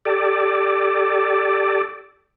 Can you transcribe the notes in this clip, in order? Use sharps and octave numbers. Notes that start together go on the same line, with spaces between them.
G4 A4 D5